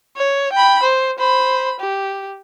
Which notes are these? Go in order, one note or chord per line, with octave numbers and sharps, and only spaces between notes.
C#5
G5 B5
C5
C5 B5
G4